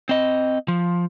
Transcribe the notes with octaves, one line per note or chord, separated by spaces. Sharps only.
C4 D#5
F3